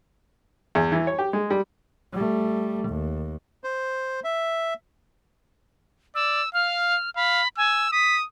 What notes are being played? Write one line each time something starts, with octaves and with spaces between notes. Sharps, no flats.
E2
E3
C#5
G4
G#3
G3
G3 A3
D#2
C5
E5
D5 E6
F5 F6
F5 B5
G#5 E6
D#6 B6